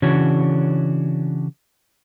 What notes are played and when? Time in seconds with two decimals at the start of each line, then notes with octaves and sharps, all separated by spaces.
0.02 C#3 E3 C#4 D4 F#4 C#5